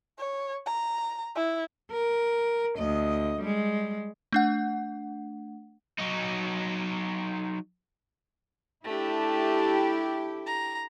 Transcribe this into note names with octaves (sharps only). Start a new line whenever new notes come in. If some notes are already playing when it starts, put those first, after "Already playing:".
C#5
A#5
E4
A#4
D2 D#5
G3 G#3
A3 D4 F#5
F#3 D#4
A3 D4 E4 G4
A#5